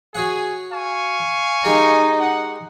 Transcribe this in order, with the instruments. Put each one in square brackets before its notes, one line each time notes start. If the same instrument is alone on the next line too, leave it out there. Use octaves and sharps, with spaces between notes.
[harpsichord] F#4 C#5 F#5 [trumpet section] G#4
[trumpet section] F5 G#5 C#6
[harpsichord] G#3 G4 A#4 [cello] D#4
[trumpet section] F#5